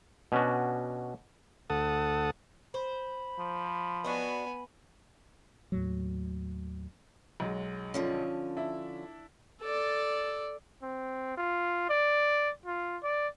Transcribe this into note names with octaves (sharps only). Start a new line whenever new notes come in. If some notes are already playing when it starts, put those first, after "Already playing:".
B2 C#4 D4 F#4
D2 A4 F#5 A5 D#6
C5 B5
F3
B3 D4 F#4 D#5 G#5
D#2 A2 F#3
B1 F#3 G#3
D3 F3 C#4
D4 E4 E5
A4 D5
C4
F4
D5
F4
D5